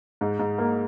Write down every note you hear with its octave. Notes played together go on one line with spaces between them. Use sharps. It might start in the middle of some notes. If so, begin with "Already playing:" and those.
G#2
G#2
A#3